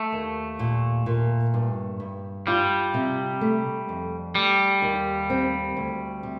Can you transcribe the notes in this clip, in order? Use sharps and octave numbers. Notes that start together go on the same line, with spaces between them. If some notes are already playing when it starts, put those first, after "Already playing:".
Already playing: A3
D#2
A#2
A#2
G2
G2
G3 F4
C3
A3
F2
G3 A3
D#2
C4
D2
C3